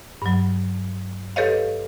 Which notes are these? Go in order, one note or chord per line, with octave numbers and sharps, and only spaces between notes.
G2 F#3
G4 A4 B4 C#5 D#5 F5